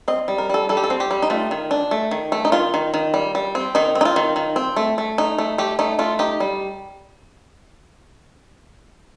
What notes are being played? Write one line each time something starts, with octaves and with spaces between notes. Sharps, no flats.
C4 D#5
G3
A#4
G3 A4
G3 A4
G4
A4
C4
G4
G3
D#4
A3 F4
D#3
D4
A3
D#3
A3
D#4
D#3 F4
D#3
D#3
G3
G3
C4
D#3 D#4
C4
D#4
F4
D#3
D#3
C4
A3
A3
D#4
A3
A3 G4
A3 D#4
A3 F4
D#4 G4
G3